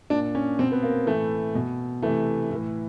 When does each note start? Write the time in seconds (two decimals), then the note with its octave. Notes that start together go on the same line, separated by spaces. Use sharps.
0.10 A#2 D4
0.35 C#4
0.59 B2 C4
0.72 B3
0.83 A#3
1.06 A2 E3 A3
1.55 B2
2.02 C3 E3 A3
2.50 A2 E3